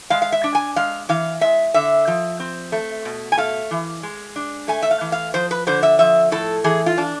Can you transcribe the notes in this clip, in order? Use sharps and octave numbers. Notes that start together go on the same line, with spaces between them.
G#3 F5
F5
E5
D4
G#5
G#3 F5
E3 F5
G#3 E5
D3 E5
F3
C4
A3
B2
G#5
A3 F5
E3
G#3
D4
A3 G#5
E5
F5
E3
F5
F3 C5
B4
D3 C5
E5
F3 E5
A2 A4
E3 G#4
F4
D4